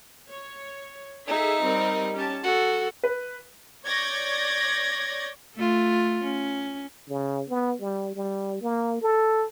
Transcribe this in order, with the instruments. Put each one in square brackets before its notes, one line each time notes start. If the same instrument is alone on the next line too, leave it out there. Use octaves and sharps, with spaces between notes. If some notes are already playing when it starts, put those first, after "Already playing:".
[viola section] C#5
[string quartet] D#4 [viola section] G#4 A4 E5
[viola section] G3 C4 A#4
C#4 G4 A5
[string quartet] F#4 [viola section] A4
[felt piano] B4
[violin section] C#5 D5 G6 G#6 A#6
[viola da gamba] A3 F4
C#4
[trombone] C#3
B3
G3
G3
A#3
A4